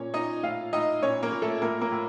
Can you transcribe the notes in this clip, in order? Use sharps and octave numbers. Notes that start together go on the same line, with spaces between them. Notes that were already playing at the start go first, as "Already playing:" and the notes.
Already playing: A#2 C#4 C#5
A#2 D#4 D#5
A2 F4 F5
A2 D#4 D#5
A#2 C#4 C#5
A#3 A#4
A#2
A3 A4
A2 A#3 A#4
A#3 A#4
A2